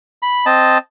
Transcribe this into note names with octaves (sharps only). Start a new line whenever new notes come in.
B5
C4 D#5 A5